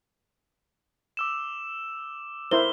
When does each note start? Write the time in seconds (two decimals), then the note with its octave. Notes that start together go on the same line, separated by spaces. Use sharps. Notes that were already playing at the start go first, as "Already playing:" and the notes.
1.17 D6 E6 E7
2.51 E4 A#4 C5 G7